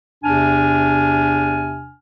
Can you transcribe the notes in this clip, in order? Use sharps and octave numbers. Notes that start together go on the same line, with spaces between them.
E2 C3 D4 G#5 F6